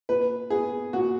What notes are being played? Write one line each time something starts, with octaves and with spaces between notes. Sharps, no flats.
A#2 B4
B3 G#4
A#2 F#4